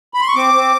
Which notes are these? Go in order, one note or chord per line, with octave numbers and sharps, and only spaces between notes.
B5
C6
C#6
C4 D6
C4